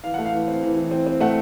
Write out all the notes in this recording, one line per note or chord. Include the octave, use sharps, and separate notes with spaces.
E3 F5
A3 F#5
F5
E3
C4
E3
E3
C4
C4
A3 F#5